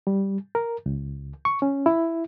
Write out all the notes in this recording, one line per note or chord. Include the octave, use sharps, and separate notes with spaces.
G3
A#4
C#2
C#6
C#4
E4